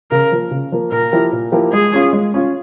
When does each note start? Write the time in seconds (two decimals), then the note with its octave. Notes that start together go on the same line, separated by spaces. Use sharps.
0.11 C#3 A#4
0.32 F3 A#3
0.51 C#3
0.72 F3 A#3
0.91 A#2 A#4
1.12 F3 A#3 E4 G4
1.32 A#2
1.52 F3 A#3 E4 G4
1.72 G#3 G#4
1.94 C#4 F4
2.13 G#3
2.34 C#4 F4